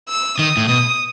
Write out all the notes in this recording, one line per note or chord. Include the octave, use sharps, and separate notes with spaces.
E6
D#3 D#6
A2
B2 D#6